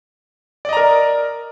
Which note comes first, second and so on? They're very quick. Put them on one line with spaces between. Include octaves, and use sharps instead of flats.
D5 D#5 A#5 A#4